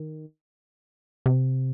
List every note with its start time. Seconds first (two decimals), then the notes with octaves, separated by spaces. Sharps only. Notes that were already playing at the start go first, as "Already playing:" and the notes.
Already playing: D#3
1.26 C3